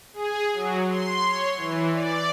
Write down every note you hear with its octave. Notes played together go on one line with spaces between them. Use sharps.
G#4
F#3
C6
C#5
E3
D5